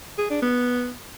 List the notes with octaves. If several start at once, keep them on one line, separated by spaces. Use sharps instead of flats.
G#4
D4
B3